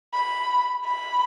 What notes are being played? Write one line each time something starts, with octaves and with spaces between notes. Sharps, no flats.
B5
B5